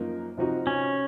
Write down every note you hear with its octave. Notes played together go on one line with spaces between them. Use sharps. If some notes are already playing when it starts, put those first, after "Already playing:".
Already playing: F#2 F3 A#3 D#4
C3 F3 C4 D#4 F#4
C#4